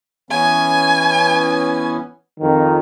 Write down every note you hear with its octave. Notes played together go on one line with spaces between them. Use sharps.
E3 B3 C#4 G#5
F2 D#3